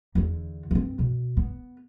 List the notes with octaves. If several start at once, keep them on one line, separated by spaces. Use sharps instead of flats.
E2 D3
G2 C4
B2
B3